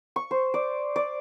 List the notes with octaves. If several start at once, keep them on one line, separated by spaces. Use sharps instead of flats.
C#6
C5
D5
D5